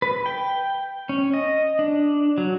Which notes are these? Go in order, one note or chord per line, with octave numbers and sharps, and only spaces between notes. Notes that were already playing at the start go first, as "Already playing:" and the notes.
B4
G5
C#4
D#5
D4
F#3